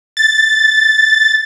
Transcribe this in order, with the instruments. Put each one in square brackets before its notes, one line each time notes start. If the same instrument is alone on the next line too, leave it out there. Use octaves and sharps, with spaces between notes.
[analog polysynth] A6